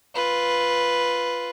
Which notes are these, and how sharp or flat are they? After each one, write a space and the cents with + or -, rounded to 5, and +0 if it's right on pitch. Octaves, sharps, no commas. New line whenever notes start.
F4 +0 B4 +0